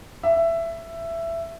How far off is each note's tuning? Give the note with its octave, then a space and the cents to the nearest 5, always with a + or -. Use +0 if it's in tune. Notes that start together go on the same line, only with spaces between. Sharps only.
E5 +15